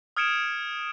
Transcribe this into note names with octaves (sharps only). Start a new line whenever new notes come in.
D#6 F6 G#6 C#7 D7 E7